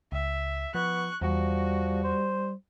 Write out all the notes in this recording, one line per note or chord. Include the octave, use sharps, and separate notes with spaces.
C#2 E5
F3 B3 C#6 F#6
E2 F3 G3 F#4
C5